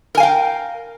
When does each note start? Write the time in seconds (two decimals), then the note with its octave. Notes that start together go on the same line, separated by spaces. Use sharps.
0.15 A#4
0.17 G#5
0.20 F5
0.23 G5